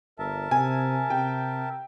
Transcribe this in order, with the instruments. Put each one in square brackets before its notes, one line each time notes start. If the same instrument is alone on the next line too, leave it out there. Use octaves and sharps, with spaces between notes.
[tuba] G1 [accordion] A#4 E5 A5
[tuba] C3 [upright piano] G#5
[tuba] C3 [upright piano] G5